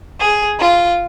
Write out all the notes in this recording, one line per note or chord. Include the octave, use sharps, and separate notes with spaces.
G#4
F4